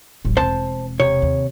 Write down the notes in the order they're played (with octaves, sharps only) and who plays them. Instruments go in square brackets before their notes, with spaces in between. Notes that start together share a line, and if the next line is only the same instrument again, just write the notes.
[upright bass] D1 A1
[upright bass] E1 C4 [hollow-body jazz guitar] C5 A5
[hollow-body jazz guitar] C3 C#5
[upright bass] D#2